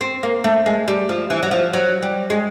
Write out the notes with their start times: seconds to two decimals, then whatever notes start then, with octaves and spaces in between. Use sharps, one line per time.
0.01 C4
0.23 A#3
0.44 A3
0.66 G#3
0.88 G3
1.09 F3
1.30 E3
1.43 F#3
1.51 F3
1.73 F#3
2.02 G3
2.30 G#3